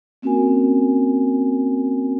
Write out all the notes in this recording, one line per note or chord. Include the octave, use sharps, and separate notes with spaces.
A#3 C4 C#4 F#4 A#4 G#5